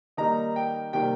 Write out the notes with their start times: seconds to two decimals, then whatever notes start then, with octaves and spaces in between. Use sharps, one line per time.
0.17 D#3 G3 A#3 D#4 A#5
0.56 G5
0.93 C3 D#3 G3 A#3 G5